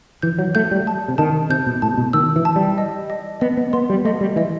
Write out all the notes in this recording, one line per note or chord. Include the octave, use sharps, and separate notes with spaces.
E3 G6
F#3
A3 G6
G3
A5
C3
D#3 A5
C3 G6
B2
A2 A5
B2
D#3 E6
E3
A5
G3
D#5
D#5
B3 D#5
B3
B3 C6
G3
A3 D#5
G3
E3 D#5